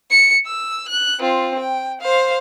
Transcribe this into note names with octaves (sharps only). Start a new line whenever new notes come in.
C#7
E6
F#6
C4 F4
G5
C5 F5